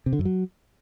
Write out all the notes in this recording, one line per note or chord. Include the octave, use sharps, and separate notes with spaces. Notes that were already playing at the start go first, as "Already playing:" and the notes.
C3
D3
F#2
F#3